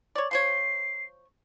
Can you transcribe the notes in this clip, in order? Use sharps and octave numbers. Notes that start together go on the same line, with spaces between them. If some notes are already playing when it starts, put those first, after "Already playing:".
C#5 D5
F3 C5 C#5 C7